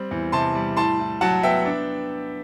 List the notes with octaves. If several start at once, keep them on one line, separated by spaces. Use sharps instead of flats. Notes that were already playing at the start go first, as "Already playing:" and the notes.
Already playing: G3 C4
E2
C3 A5 C6
G3
A2 A5 C6
A2
F#3 F#5 A5
B3 E5 G5
D4